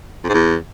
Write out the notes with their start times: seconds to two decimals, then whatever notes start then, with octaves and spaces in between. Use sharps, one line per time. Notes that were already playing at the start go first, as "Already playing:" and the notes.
0.24 F2
0.29 G#2
0.34 E2